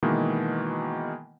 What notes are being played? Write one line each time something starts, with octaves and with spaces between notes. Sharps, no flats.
B2 D#3 E3 G#3 A#3